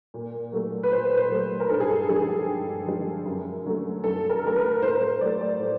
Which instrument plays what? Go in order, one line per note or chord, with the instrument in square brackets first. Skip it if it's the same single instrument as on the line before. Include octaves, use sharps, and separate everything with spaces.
[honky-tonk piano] A#2
F#3 A3
B4
A#2 C5
C5
F#3 A3
A#4
G2 A4
G#4
A4
D3 F3 G#3 G#4
G4
G2
D3 F3 G#3
F#2
D3 F#3 A3
F#2 A4
A#4
D3 F#3 A3 A#4
B4
A2 C5
C5
F#3 D5
A3
D5
A2